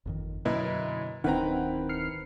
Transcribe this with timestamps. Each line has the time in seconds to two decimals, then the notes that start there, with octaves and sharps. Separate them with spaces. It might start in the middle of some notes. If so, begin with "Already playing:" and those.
0.05 G1 F2 D#3
0.45 F#2 B2 D3 A#3 E4 B4 D#5
1.24 D1 D#3 C4 D4 E4 B4 F#5 A#5
1.89 F6 C7 C#7